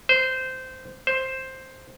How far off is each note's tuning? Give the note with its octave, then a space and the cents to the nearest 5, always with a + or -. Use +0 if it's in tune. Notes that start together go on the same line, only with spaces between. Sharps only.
C5 -15
C5 +5